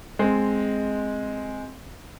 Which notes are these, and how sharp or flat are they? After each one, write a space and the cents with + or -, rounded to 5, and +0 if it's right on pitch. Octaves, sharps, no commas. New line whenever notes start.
G#3 +0 C4 +0